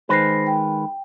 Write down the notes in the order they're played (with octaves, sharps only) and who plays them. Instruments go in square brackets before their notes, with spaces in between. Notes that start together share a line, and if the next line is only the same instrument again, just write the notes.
[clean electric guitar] D#3 G#3 B4 [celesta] C5 A#6 C7
[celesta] G5